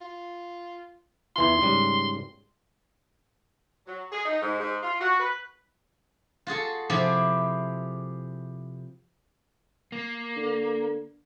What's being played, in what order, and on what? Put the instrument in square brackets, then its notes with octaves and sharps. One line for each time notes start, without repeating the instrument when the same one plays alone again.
[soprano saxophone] F4
[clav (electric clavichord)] E2 E3 F4 [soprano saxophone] C6
[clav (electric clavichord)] G#2 C#3 G3
[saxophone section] F#3
G#4
D#4
G#2
G#2
F4
F#4
B4
[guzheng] F4 F#4 G#4 A4
C3 F3 E4 G4 G#4
[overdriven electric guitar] A#3
[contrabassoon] D3